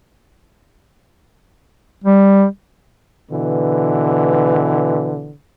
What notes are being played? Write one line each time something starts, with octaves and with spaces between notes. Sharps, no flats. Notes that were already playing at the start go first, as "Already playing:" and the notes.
G3
B2 D3 E3